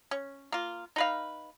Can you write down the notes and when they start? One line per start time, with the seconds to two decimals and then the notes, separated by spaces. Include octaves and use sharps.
0.11 C#4
0.52 A#3 F4
0.96 D#4 B4 F5